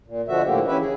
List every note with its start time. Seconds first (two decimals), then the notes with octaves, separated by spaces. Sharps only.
0.06 A#2
0.28 B2 D3 F3 F#4 E5
0.44 A2 D3 A#3 G4
0.67 E3 C#4 E4 G4 B4 E5
0.80 G#4